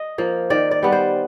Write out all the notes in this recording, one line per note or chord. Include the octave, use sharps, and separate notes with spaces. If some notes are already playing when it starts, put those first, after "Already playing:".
Already playing: D#5
F3 A#3
D#3 D5
D5
G3 B3
C5